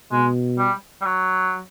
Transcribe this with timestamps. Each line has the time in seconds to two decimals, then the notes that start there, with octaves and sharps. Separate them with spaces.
0.12 B2 G#3
0.58 G3
1.01 G3
1.05 F#3